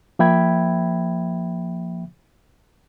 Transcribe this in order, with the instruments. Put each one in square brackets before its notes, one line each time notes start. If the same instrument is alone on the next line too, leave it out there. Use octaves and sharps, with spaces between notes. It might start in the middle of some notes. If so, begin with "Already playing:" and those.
[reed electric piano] F3 A#3 E5 G5 B5 G#6